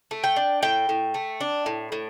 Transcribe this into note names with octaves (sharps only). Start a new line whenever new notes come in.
A3
G5
D4
A2 G5
A2
A3
D4
A2
A2